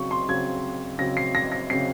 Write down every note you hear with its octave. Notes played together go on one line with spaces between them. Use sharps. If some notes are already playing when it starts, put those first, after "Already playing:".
Already playing: C#3 F#3 C4 C#6
C6
C#3 F#3 C4 G#6
C#3 F#3 C4 A#6
C7
A#6
A#6
C#3 F#3 C4 C7